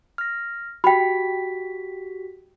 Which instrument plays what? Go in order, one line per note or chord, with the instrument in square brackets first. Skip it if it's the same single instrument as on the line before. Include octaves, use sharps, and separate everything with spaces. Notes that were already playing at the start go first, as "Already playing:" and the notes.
[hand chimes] F6 A#6
[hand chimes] F#4 G4 B6 [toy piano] G5 B5